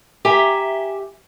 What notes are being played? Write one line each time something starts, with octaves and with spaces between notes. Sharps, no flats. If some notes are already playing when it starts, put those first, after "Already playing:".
G4 E5 G#5 A#5